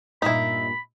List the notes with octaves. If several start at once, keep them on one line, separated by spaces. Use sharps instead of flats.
G2 A#2 D#4 E4 E5 B5